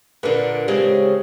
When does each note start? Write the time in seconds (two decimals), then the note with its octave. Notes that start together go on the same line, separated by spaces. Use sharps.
0.23 A#2 D3 D4 A#4 B4
0.68 C#3 G#3 C4 G4